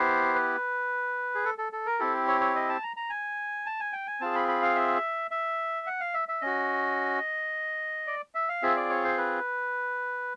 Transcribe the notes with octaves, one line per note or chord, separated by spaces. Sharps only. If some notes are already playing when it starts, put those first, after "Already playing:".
Already playing: B3 E4 G4 C5
B4
G#4
A4
A4
A4
A#4
C4 E4 G4 A4
C#5
C#5
D#5
A5
A#5
A#5
G#5
A5
G#5
G5
G#5
C4 F4 G#4 A5
B5
B5
F5
E5
E5
F#5
F5
E5
E5
C#4 F#4 D#5
D5
E5
F5
C4 F4 G#4 E5
D5
C#5
C5
B4